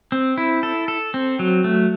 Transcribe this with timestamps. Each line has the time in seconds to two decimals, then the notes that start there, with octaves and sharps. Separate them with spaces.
0.12 C4
0.38 E4
0.63 A4
0.88 A4
1.14 C4
1.39 F#3
1.64 A3